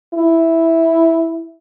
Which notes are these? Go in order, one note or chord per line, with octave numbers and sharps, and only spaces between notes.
E4